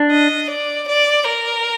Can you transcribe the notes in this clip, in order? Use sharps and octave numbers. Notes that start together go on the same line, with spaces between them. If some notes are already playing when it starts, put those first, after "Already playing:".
Already playing: D4
D#5
D5
D5
A#4